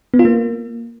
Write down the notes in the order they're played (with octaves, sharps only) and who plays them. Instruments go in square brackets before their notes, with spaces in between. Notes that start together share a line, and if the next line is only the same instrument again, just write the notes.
[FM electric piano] B3
F4
A#3